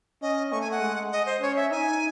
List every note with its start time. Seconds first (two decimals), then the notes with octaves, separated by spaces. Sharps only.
0.22 C#4 D#5
0.52 A3 C#6
0.61 G#5
0.71 F#5
0.81 G#3
1.12 D#5
1.26 C5
1.41 C#4 C#5
1.56 E5
1.71 D#4 G#5